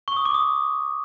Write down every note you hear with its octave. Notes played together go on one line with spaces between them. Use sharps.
C#6
D#6
D6
D#6